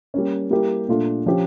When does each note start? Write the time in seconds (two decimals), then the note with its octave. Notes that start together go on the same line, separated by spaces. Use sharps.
0.14 G3 A#3 C#4
0.51 G3 A#3 E4 G4
0.88 A#2 A3 D4 F4 A4
1.26 F3 C#4 G4